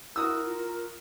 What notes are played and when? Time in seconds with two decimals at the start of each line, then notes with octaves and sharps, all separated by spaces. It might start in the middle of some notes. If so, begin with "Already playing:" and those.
0.16 E4 F#4 A#4 D#6 E6
0.46 F4